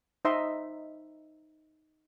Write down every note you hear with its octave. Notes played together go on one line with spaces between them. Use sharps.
D#4 C5 D#5 E5 C6